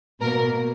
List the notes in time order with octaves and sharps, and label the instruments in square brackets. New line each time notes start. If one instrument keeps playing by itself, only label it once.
[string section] B2 A#3 A#4